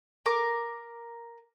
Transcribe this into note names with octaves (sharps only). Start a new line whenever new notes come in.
A#4 D6